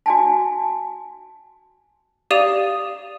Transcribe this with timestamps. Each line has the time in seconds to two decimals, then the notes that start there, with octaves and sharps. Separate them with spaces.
0.06 F#4 G#5 A5
2.31 G4 D5 F5 D#6 D#7 F7